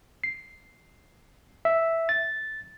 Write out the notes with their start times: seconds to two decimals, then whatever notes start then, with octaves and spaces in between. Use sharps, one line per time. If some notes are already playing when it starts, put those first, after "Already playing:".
0.24 C7
1.65 E5
2.09 A6